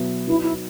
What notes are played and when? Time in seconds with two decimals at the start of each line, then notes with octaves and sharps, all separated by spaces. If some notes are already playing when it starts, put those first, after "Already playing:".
Already playing: B2 F#3 B3 E4
0.27 F#3 B3 D#4 E4
0.42 E4